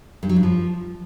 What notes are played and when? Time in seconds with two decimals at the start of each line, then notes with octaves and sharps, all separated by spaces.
0.23 G2
0.29 F#3
0.36 G2
0.43 F3